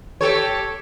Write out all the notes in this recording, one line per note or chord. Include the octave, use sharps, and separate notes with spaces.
G4 A4 C#5